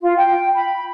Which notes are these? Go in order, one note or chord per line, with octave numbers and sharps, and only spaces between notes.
F4
G5
B5